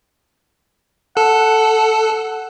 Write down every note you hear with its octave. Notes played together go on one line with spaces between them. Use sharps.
A4 F#5